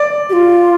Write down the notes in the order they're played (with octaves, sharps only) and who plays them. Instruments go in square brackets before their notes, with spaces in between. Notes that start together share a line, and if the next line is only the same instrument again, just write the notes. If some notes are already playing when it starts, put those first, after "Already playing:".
Already playing: [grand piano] D5
[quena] G4
F4